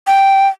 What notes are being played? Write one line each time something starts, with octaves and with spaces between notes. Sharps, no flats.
G5